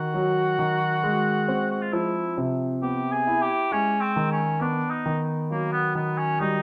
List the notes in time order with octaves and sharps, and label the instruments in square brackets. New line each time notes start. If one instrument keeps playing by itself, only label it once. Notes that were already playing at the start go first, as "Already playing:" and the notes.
Already playing: [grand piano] D#3 [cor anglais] F#4
[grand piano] F#3
D#3
G#3
C4
[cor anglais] F#4
F4
[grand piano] F3 [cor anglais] E4
[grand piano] C3
[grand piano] B3 [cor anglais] G4
[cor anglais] G#4
[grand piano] E4
[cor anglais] G4
[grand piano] G#3 [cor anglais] C#4
[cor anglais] C4
[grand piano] D#3
[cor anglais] C#4
[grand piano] B3 [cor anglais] D4
[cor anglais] D#4
[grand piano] D#3
[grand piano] F#3 [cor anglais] A#3
[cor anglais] B3
[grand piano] D#3 [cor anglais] B3
[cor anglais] C#4
[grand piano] G3 [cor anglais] D#4